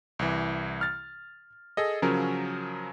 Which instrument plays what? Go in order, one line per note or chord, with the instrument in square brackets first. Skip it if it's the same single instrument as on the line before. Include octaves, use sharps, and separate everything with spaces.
[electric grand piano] C2 E3
F6 A6
G#4 A4 D#5
C#3 F3 F#3 C#4 A#4